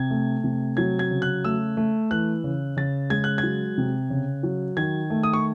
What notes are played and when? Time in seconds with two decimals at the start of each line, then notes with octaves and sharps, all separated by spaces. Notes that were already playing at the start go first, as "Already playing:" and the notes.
Already playing: C3 G#6
0.10 A3
0.44 C3
0.77 F#3 G#6
0.99 G#6
1.11 C#3
1.22 F#6
1.44 A3 E6
1.77 A3
2.11 E3 F#6
2.44 C#3
2.77 C#3 A6
3.10 G#3 G#6
3.24 F#6
3.38 G#6
3.43 F#3
3.78 C3
4.10 C#3
4.43 F#3
4.77 D#3 G#6
5.10 A3
5.23 D#6
5.33 C#6